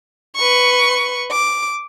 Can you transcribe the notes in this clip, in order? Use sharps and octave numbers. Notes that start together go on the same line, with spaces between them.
B4 C#6
D6